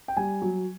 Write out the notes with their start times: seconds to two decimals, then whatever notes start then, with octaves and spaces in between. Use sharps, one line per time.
0.08 G5
0.17 G3 G#5
0.42 F#3